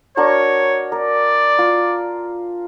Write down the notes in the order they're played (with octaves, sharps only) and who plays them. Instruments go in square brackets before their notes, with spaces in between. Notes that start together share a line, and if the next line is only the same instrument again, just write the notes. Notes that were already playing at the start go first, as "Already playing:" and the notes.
[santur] D4 F#4 A#4 [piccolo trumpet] C#5
[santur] A#4 [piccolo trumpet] D5
[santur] F4